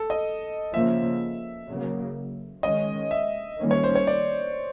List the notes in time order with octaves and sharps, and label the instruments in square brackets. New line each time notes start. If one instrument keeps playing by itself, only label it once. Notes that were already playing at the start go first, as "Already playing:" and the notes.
Already playing: [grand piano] A4
D#5
[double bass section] C#3 F3 A#3 [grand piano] E5
[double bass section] C#3 F#3 A#3
[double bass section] D#3 G#3 C#4 [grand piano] D#5
[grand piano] E5
[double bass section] D#3 G3 A#3 C#4
[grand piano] C#5
C5
C#5
D5